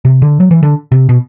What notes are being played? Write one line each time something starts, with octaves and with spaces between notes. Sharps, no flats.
C3
D3
F#3
E3
D3
C3
B2